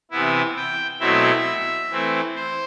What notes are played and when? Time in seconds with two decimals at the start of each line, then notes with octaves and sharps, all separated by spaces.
0.11 C3 E3 B3 E4
0.56 G5
1.00 B2 F#3 A3 C4 E4 E5
1.90 E3 A3 C4 E4
2.35 C5